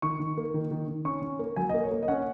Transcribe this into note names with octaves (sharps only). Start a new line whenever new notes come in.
D#3 C#6
D#3
A#3
D#3
D#3
D#3
C#4 C#6
C#4
A#3
F#3 G#5
D#5
A#3
C#5
A#3
D#5
C#4 F#5